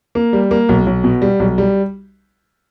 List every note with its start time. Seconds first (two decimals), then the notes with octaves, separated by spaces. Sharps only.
0.15 A#3
0.33 G3
0.51 A#3
0.69 B1
0.86 B1
1.04 B2
1.22 G3
1.40 B1
1.58 G3